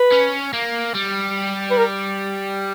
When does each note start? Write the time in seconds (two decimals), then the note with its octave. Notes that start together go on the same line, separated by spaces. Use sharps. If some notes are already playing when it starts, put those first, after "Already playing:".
Already playing: B4
0.12 C#4
0.53 A#3
0.94 G3
1.71 B4
1.78 A#4